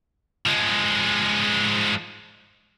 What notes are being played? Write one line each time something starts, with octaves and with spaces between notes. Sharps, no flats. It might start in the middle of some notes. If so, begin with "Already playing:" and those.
F3 G#3